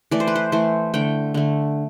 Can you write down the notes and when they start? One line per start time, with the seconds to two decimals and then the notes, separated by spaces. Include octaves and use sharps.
0.11 E3 A3 D5
0.20 C5
0.27 B4
0.35 C5
0.52 E3 A3 C5
0.94 D3 A3 G5
1.34 D3 A3